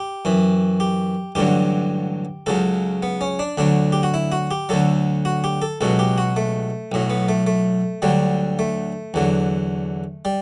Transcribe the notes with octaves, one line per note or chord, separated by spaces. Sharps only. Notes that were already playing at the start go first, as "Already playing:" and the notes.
Already playing: G4
F#2 E3
G4
A1 G2 D3 F#3 G4
C#2 C#3 F#3 A4
B3
C#4
D4
D2 D3 F#3 D4
G4
F#4
E4
F#4
G4
D2 D3 F#3 A4
F#4
G4
A4
C#2 B2 F#3 A4
G4
F#4
A3
B1 A2 F#3
B3
A3
A3
D2 D3 F#3 G3
A3
E2 D3 F#3
G3